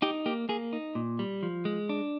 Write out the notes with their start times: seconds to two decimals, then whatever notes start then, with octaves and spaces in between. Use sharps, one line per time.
0.02 D#4 G4
0.26 A#3 G4
0.49 A#3 G#4
0.73 D#4
0.95 A#2
1.19 G3
1.43 F3
1.65 G#3
1.89 D4